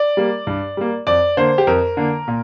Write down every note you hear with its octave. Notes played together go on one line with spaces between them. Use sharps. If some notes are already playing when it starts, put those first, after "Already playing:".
Already playing: D5
G3 A#3
G2
G3 A#3
F2 D5
D3 A#3 C5
G4
F2 A#4
D3 A#3
A#2